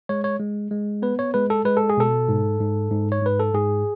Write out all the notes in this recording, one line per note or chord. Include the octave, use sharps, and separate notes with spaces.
G#3 C#5
C#5
G#3
G#3
B3 B4
C#5
G#3 B4
A4
G#3 B4
A4
G#4
B2 A4
G#2
G#2
G#2
C#5
G#2 B4
A4
G#2 G#4